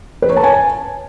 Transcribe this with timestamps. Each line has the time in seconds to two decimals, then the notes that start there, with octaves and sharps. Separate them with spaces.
0.22 B4
0.29 C#5
0.36 A5
0.44 G#5